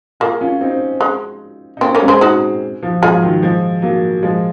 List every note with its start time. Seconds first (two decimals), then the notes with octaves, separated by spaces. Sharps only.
0.20 A#3 F4 G#4
0.41 C#4 F4
0.61 C4 D#4
1.01 G#3
1.77 D#4
1.81 A#3 C4 C#4
1.95 A#3 C#4
2.02 G#3 C4
2.08 G#4 C5
2.21 D#4 F#4
2.83 F3
3.02 F3 G#3 F4 G#4
3.22 D#3 F#3
3.43 F3 G#3
3.82 F#3 A#3
4.23 F3 G#3